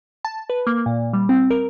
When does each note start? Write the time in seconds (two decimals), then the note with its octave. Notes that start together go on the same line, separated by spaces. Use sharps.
0.25 A5
0.50 B4
0.67 A#3
0.86 A#2
1.13 G3
1.29 C4
1.50 A#4